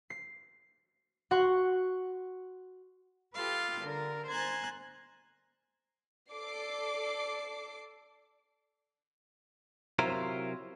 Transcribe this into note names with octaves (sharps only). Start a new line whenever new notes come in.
C7
F#4 F#5 C6 C#6
F4 G4 A4 B4 F5
D3 A#4
C5 G#5 A#5 F#6 G#6 A6
A4 D5 D6 C7
C3 F#3 E4 F4 A#4 C5